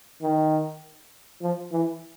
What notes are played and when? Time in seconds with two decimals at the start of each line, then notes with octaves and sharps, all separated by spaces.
0.22 D#3
1.41 F3
1.72 E3